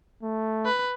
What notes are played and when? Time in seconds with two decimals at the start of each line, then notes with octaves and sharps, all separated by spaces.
0.22 A3
0.65 B4